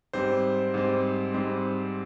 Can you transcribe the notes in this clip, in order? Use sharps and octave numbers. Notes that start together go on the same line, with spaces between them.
G#2 G3 C4 C5
G#2 G3 C4
G#2 G3 C4